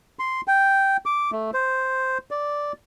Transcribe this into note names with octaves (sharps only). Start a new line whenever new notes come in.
C6
G5
D6
A3
C5
D5